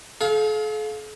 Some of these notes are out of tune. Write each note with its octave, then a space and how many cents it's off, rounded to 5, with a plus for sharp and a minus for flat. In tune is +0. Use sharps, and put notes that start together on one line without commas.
A4 -45 F5 +15